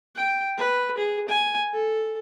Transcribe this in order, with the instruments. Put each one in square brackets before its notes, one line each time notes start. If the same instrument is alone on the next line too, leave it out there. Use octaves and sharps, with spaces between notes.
[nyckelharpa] G5
B4
G#4
G#5
A4